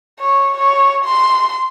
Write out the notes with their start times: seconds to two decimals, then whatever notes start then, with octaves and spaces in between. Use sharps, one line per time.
0.20 C#5
0.57 C#5
1.04 C6